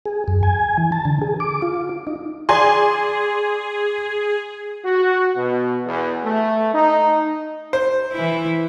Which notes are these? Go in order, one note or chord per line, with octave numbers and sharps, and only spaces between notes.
G#4
F#2
G#5
E3
A5
D3
G#4
D6
F4
D#4
G#4 D5 G#5 C6
F#4
B2
E2
A3
D#4
C5
E3 E4